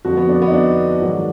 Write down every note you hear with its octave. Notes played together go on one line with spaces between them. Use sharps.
F2 D3 F3 F#4
B3
D4
B3
D#4
D4
G#2 D#3 F#3